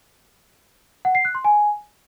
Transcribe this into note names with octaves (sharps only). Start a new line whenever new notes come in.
F#5
C7
F#6
C6
G#5